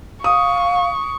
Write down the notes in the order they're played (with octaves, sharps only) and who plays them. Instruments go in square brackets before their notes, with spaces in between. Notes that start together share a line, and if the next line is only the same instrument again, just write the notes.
[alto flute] F5 [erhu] C#6 [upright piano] D#6